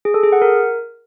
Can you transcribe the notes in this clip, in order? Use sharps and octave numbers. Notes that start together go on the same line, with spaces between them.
G#4
A4
G#4
F#5
A#4